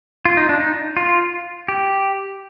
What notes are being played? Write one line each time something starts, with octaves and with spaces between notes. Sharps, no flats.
F4
D#4
D4
D#4
F4
G4